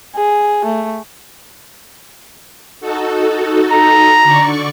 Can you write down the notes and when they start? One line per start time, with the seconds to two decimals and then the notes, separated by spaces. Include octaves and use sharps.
0.15 G#4
0.65 A3
2.80 D#4 F#4 A4
3.71 A#5
4.24 D3 D5 C#6